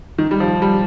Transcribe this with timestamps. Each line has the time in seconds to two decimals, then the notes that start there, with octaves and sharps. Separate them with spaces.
0.18 D#3
0.31 G3
0.40 F3
0.62 G3